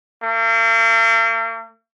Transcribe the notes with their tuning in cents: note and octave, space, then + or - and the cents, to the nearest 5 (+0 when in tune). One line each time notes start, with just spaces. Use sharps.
A#3 -45